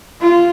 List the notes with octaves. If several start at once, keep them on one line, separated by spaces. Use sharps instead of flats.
F4